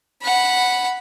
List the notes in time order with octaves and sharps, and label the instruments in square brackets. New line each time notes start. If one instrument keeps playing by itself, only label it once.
[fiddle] F#5 B5